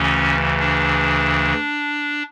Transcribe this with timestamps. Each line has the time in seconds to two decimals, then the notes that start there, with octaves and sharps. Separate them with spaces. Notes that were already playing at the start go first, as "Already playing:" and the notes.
Already playing: D2 C#3 E3 C#4
0.59 D4